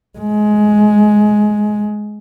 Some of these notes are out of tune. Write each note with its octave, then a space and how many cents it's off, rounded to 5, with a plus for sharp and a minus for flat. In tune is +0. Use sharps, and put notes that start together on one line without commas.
G#3 +15